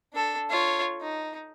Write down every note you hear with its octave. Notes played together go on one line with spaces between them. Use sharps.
D4 A4
F4 C#5
D#4